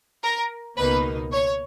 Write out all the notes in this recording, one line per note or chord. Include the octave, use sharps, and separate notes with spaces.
A#4
C#2 B2 A#3 D#4 B4
C#5